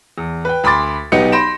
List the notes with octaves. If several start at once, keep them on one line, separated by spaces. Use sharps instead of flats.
E2
B4 G5
D2 B5 C6 D6 A6
B1 B3 D#4 G4 C#7
B5 C6 G6 A#6 D7 E7